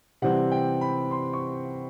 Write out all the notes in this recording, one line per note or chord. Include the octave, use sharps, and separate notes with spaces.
C3 E3 G3 C4 F#5
G5
B5
C6
C#6